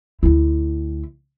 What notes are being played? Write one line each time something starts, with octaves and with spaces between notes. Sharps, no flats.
D2 E4